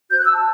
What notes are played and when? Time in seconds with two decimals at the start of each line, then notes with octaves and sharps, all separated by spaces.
0.10 F#4 C5 G6
0.18 F#6
0.25 E6
0.34 A5